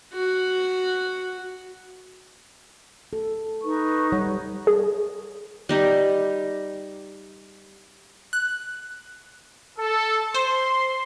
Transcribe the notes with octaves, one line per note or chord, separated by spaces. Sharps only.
F#4
A4
D#4 B4 C#6
G3 C#5 F#5
G#4
G3 D#4 G4
F#6
A4
C5 C6